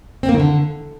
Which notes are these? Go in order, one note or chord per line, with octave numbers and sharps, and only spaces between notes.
C4
A#3
D#3
D3